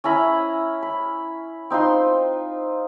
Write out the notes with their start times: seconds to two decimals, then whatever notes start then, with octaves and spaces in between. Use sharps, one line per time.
0.04 C#4 E4 A#5 B5
0.83 B5
1.70 C4 D#4 F4 C6